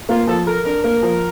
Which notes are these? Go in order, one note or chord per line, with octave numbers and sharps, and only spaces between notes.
A#3 F4
F3 A4
A4 A#4
D4 A#4
A#3 A#4
F3